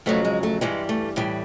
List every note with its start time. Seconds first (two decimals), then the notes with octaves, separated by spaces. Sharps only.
0.06 F2 C#3 F#3 A3 B3
0.25 G#3
0.43 A3
0.61 G2 E3 G3 G#3
0.89 A3
1.16 A2 E3 G3